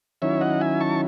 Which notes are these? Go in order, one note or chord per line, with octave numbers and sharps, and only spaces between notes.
D#3 F#3 C#4 E4 C#5 E5
D#5 F#5
E5 G#5
A5 C#6